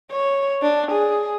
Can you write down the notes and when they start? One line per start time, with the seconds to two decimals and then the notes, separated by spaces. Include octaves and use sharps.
0.11 C#5
0.62 D4
0.92 G#4